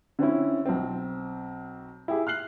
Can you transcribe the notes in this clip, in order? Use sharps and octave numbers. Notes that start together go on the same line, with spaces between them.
D3 C4 C#4 E4
B1 C4
E4 G4 G#4
F6 F#6 C7 F#7